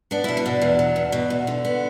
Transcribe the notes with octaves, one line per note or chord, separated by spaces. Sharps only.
B3 D4
B2 E4
D4
B2
E2
F#3
E2
B2
E2
D3
B3